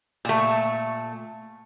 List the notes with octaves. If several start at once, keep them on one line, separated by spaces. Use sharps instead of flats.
A#2 A3